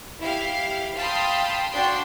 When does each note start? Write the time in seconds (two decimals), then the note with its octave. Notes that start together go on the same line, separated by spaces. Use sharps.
0.20 E4 G4 F5
0.95 F5 G5 A5 B5 C6 D#6
1.72 D4 F#4 G5 C6